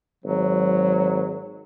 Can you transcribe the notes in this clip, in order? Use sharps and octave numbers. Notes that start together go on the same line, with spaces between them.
G#1 F#3